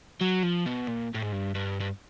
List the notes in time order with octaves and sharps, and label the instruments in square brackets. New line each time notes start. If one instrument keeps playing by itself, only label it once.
[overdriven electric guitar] F#3
F3
B2
A#2
A2
G#2
G2
G2
G2